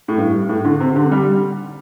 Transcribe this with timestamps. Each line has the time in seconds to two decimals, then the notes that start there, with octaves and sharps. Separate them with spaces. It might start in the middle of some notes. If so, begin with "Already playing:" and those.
0.08 A2
0.18 G2
0.49 A2
0.65 D3
0.80 C3
0.96 D3
1.11 G3